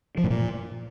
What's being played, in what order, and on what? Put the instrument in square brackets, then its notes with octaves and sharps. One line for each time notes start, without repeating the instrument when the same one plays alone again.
[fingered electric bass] F3
A2
A#2